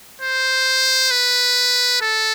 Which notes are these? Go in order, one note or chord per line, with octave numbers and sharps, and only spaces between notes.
C5
B4
A4